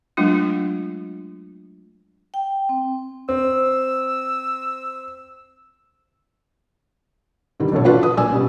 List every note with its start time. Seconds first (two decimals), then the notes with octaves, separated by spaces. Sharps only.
0.17 F#3 G#3 A3 D4 F4
2.34 G5
2.69 C4
3.29 C4 E6
7.60 G2 D3 D#3 G3
7.72 A#1 B2 F3 A4 C#5
7.84 E3 D4 F4 F#4 B4 D5
8.02 B4 D#6
8.17 A#1 D5 G#5 E6
8.30 B2 G3 C#4